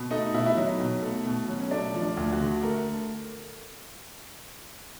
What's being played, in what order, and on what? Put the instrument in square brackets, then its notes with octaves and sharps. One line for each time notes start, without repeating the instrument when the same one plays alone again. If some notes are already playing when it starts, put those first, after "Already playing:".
Already playing: [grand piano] B2
A3 D#4
B2 E4
E4
F#3 D#4
B2
A3
B2
F#3
C#4
A3 D4
F3
D4
D2
F#4
D3
A3 A#4